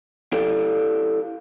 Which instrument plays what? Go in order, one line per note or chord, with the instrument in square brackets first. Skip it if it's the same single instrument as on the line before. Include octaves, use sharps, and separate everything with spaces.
[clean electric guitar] E4 G4 A4 D5 F5